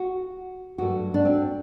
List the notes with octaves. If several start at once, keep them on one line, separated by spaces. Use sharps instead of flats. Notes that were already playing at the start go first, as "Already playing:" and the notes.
Already playing: F#4
G2 F#3 A3 F#4
D4
C4